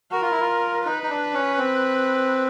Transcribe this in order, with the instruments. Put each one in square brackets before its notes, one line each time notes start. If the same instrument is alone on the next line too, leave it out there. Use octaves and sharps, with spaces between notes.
[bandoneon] F#4 [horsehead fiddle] A#4
[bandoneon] F4
E4
F4
[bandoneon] D#4 [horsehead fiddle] B4
[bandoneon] D#4
D4
C#4
C4